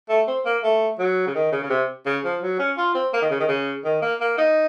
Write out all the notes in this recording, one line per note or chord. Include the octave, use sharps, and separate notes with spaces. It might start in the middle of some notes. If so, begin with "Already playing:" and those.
A3
C4
A#3
A3
F#3
C#3
D#3
C#3
C#3
C3
C#3
F3
F#3
C#4
F4
C4
A#3
D#3
C#3
D#3
C#3
D#3
A#3
A#3
D#4